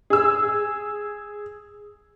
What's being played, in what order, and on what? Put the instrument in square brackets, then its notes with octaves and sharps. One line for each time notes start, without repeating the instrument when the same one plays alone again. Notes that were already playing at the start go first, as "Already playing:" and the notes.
[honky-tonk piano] G#4 E6